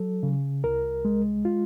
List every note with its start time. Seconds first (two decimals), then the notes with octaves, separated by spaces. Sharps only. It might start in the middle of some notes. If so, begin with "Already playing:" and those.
Already playing: F#3 A4
0.23 C#3
0.64 C2 A#4
1.05 G#3
1.45 F4